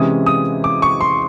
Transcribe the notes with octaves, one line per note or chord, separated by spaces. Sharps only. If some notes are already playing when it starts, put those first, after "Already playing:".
Already playing: C3 E3 G#3 C#4 E4 D#6
D#6
D6
C#6
C6